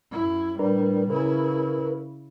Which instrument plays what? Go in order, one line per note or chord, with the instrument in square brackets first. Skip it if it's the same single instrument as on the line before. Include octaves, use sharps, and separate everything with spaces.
[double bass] F#2 E4
[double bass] A2 G3 [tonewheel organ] D4 A#4 B4
[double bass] C#3 E4 [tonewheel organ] A#4 B4